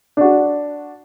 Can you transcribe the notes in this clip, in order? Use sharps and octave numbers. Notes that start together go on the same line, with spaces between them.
D4 F#4